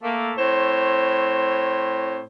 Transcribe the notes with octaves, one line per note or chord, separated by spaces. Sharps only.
A3 A#3
A2 C4 C5 C#5